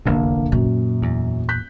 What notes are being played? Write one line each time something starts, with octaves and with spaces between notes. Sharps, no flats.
F1 A#1 E2 D3 A#3
F#2 A#2
E2
F#6 G6 B6